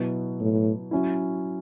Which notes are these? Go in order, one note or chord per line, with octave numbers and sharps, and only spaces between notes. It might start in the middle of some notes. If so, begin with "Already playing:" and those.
Already playing: B2 F#3 B3 E4
A2
F#3 C#4 E4